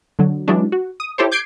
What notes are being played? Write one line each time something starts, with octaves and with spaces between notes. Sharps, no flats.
D3 F#3
E3 F#3 G#3 C#4 D4
F#4
D#6
E4 G4 A4 C5 C#5
D6 G6 G#6 C7 D7